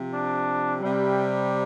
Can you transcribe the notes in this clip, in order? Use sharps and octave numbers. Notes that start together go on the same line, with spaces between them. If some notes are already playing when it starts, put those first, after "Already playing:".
Already playing: C3 F3
D4
C3 G3